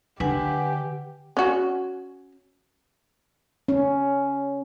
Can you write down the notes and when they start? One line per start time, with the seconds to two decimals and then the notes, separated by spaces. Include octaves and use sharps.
0.20 D3 G4 B4 F#5 G#5
1.37 C#4 F#4
3.68 C#4